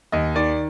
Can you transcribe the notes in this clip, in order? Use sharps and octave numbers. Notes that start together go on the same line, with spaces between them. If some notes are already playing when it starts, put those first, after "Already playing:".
D#2 D#5
D#3 D5